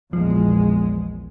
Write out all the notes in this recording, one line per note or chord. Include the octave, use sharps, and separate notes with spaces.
A#1 E2 F3 G#3